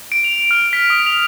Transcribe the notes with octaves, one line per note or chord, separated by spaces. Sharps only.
D7
F7
F6
B6
D#6
F7